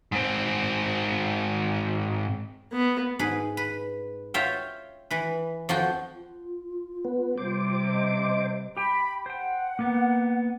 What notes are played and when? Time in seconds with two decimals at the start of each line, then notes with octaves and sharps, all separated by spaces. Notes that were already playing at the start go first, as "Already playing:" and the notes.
0.12 G#2 C4
2.73 B3
3.19 G#2 G#4 B4
3.57 B4
4.34 F4 C#5 E5 G5
5.11 E3 B4
5.69 F2 F3 F#4 G5
6.14 F4
7.05 B3
7.38 C3 G3 C5 D6
7.93 D#5
8.77 G4 G5 B5
9.26 C5 F#5 G5
9.79 A#3 B3